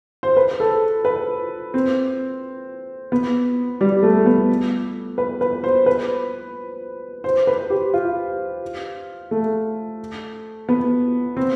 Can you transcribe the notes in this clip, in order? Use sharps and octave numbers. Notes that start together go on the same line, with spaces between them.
C5
B4
A4
B4
C4
B3
G3
A3
B3
B4
B4
C5
B4
C5
B4
G4
F4
A3
B3
C4